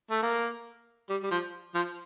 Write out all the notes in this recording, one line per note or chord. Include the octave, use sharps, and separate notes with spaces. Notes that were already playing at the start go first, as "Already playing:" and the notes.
A3
A#3
G3
G3
F3
F3